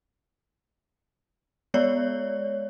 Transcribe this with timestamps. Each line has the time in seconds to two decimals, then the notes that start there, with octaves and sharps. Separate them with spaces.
1.74 G#3 B3 C#5 D5